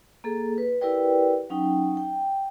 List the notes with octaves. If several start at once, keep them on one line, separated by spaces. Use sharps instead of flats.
A#3 G#4 A4
B4
E4 G4 A#4 B4 D5 G5
F#3 C#4 D#4 G5
G5